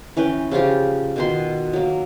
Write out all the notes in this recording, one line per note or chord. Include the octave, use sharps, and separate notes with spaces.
E3 C#4 B4 G5
C#3 F3 F4 G4
B2 D#3 C6
F#3 A#3